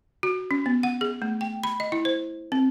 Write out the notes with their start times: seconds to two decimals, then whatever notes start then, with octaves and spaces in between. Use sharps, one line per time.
0.23 F#4
0.51 C#4
0.66 B3
0.83 F#5
1.01 G#4
1.22 A3
1.41 G5
1.64 B5
1.80 D#5
1.92 E4
2.05 C5
2.52 C4